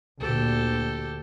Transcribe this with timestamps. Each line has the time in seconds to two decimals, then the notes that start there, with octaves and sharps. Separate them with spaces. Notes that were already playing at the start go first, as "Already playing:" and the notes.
0.20 D2 A#2 G4 A4